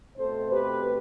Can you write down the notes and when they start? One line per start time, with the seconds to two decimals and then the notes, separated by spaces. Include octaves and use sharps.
0.16 B2 A3 C4 A4 C5
0.51 G4 B4